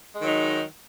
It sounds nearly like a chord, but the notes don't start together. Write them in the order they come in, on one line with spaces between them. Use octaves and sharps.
G#3 D#3 F#3 D#4